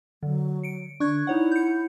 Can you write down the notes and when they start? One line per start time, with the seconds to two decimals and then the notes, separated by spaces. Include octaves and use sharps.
0.23 D3 F#3
0.63 C#7 D7
1.00 D3 D4 C#6 F#6 G#6
1.27 D#4 E4 C#5 F#5
1.52 G6 C#7